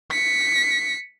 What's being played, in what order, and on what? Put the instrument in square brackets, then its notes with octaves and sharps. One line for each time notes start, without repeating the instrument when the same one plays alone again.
[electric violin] B6 C#7